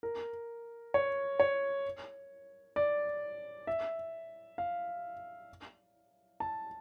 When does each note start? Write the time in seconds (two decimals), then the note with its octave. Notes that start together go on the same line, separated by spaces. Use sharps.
0.03 A#4
0.94 C#5
1.40 C#5
2.76 D5
3.67 E5
4.58 F5
6.40 A5